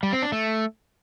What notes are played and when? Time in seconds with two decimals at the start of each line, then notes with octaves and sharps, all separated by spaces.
0.03 G3
0.13 C4
0.22 D4
0.32 A3